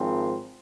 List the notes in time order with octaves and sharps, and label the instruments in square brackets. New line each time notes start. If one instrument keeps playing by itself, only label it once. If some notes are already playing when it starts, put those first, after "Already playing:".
Already playing: [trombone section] G#1 G#2 F3 C4